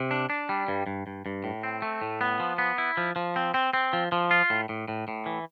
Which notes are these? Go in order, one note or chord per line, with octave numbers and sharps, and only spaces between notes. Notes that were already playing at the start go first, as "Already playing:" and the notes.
Already playing: C3
D4
D4
G3
G2
G2
G2
G2
A2
C4
A3
A2
B3
F3
B3
E4
F3
F3
C4
C4
C4
F3
F3
F4
A2
A2
A2
A2
E3